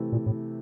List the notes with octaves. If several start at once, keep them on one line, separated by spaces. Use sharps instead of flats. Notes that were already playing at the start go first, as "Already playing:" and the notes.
Already playing: C3 E3 A3 E4
A#2
A2